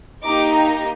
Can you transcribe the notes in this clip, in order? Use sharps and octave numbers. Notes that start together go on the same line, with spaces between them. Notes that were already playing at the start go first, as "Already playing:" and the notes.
A#3 D#4 G4 D6
A#5